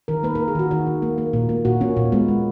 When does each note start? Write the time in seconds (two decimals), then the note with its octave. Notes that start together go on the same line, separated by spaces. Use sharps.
0.08 D#3 A#4
0.23 A#3 B4
0.35 A#4
0.40 A#3
0.48 G#4
0.55 D#3 F#4
0.71 D#3 F#4
0.87 D#3
1.02 A#3
1.18 A#3
1.33 A#2
1.49 A#3
1.65 A#2 F#4
1.81 A#3 C#4
1.97 A#2
2.12 G#3 B3
2.28 G#3